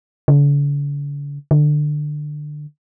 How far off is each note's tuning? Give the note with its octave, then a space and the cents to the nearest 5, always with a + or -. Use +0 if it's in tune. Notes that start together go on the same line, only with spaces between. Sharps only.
D3 -45
D3 +20